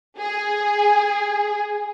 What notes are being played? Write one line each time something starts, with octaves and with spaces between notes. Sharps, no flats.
G#4